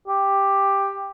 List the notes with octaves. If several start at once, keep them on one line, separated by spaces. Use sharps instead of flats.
G4